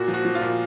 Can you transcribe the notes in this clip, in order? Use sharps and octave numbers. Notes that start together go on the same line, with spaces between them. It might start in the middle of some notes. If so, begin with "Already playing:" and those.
Already playing: A#2 F#4
F3
F#4
F3
F4
A#2